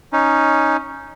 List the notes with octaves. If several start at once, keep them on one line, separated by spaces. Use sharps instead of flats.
C#4 D#4